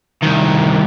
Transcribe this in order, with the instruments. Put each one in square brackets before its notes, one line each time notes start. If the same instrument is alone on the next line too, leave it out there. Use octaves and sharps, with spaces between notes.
[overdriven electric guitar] C2 D#3